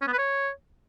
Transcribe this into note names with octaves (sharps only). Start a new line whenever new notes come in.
C#4
B3
B4
C#5